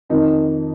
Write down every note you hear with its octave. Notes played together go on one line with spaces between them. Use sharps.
F2 D#3 D#4